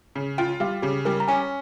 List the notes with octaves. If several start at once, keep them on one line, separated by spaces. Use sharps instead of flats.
C#3
F4 G5
G3 F5
C#3 G4
G3 A#4
A#5
C#4 G#5